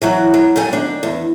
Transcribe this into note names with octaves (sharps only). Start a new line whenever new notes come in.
E3 F#3 F#4
F#3
F2 F#3 G3 G#5
D#3 D4
E2